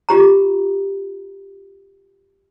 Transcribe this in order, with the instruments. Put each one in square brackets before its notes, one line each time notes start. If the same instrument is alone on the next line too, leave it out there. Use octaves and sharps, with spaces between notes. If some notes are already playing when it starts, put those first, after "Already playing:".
[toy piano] F4 G4 A#5